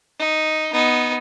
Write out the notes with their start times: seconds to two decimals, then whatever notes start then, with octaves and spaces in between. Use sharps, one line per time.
0.20 D#4
0.73 B3 D#4